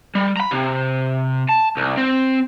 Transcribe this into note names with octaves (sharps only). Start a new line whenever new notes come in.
G3
A#5 B5
C3
A5
C2
C4